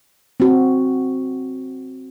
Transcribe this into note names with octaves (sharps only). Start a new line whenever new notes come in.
C4 F#4